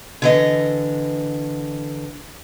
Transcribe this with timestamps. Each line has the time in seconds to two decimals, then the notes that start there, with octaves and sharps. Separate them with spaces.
0.22 D3 E3 D#5